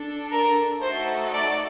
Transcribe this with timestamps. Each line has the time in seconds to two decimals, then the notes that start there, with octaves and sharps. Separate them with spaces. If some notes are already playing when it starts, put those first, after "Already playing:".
Already playing: D4 A4
0.33 A#4
0.82 A3 D#4 F#4 A4 C5
1.34 D5